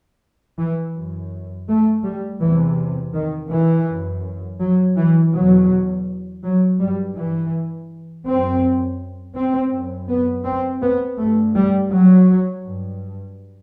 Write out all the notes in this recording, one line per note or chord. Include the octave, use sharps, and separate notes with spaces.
E3
F#2
A3
G3
E2 C3 E3
D#3
E3
F#2
F#3
E3
E2 B2 F#3
F#3
G2 G3
E3
F#2 C4
C4
F#2
B3
C4
B3
G2 A3
G3
F#3
G2